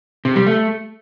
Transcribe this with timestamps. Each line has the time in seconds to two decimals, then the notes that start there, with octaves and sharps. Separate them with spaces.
0.25 C3
0.36 G3
0.47 A3